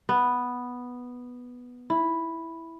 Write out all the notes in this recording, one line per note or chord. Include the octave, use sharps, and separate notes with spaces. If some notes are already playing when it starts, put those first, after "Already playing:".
B3
E4